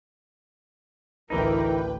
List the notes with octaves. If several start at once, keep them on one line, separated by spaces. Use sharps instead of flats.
A1 D2 E3 D#4 E4 A#4 B4 G5